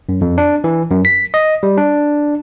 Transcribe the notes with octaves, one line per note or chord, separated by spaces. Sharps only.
F#2
F2
D4
E3
F#2
B6
D#5
G3
D4